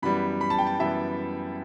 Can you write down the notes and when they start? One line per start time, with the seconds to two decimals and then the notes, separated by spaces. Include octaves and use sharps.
0.02 F#2 E3 G3 B3 B5
0.41 B5
0.50 A5
0.58 G5
0.67 A5
0.79 F#2 E3 G3 B3 E5